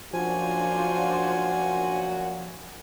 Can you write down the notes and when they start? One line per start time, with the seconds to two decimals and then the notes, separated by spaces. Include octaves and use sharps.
0.13 F#2 A#2 F3 D4 F4 F#4 C5 G#5